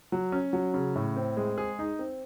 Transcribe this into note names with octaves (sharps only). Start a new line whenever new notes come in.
F#3
C#4
F#3
C#3
A2
C4
G#3
G#4
D#4
C4